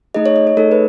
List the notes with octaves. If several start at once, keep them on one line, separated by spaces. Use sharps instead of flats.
A3 D#4 G#4 D#5
C#5
D#5
C#5
A3 D#4 G#4 A4
B4